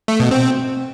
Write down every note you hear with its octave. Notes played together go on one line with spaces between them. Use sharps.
A3
B2
C4